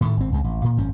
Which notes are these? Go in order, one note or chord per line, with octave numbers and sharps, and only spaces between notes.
A2 D#3 A3
G#1 C4
C#2 C#3 G#3
A1
A#2
G#1 F#2 C#4